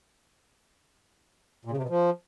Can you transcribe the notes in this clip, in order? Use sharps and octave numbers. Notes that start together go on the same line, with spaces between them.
A#2
C#3
C3
B2
F3